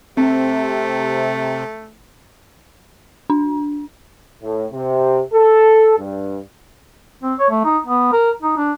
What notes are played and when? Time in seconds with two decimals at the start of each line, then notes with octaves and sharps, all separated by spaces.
0.17 C3 A3 C4
3.30 D4
4.42 A2
4.72 C3
5.33 A4
5.98 G2
7.23 C4
7.39 C#5
7.51 A3
7.65 D#4
7.86 B3
8.13 A#4
8.42 D#4
8.57 D4